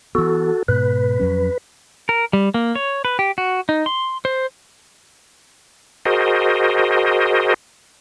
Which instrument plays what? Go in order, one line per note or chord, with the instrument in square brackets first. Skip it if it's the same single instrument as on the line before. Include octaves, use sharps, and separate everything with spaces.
[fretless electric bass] E3 B3 [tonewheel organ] F#4 A4
[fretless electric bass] G#2 B2 [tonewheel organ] B4
[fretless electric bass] F2 F#3 C#4
[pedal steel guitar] A#4
G3
A#3
C#5
B4
G4
F#4
D#4
C6
C5
[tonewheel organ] F#4 G#4 A#4 C5 D#5